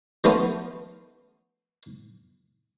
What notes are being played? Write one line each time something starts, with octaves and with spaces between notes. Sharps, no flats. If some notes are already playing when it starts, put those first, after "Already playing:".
F3 A3 B3 C#4 F4